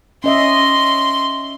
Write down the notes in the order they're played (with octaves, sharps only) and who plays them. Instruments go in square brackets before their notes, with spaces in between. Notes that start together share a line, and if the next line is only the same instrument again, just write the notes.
[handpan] C#4 D#5 E5 [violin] C6